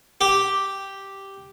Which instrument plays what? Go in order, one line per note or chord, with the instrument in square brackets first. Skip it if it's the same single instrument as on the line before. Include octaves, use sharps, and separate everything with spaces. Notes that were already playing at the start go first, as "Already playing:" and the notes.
[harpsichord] G4